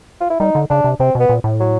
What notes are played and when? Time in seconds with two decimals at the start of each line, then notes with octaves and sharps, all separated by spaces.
0.21 F4
0.30 E4
0.40 G3 D#4
0.55 D3
0.70 C#3 D4
0.84 C3
1.00 C3 C4
1.15 B2 B3
1.29 A#2
1.44 A2
1.60 F#3